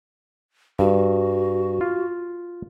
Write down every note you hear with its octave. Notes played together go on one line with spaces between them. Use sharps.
G2 F#4
F4